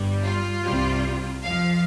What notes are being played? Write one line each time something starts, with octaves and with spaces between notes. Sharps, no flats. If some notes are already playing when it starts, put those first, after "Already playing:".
Already playing: G1 G2 G3
F4
C2 C3 G3
F2 F3 F5